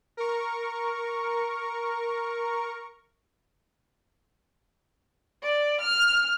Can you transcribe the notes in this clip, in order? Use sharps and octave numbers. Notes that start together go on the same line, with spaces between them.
A#4 C#6
D5
F6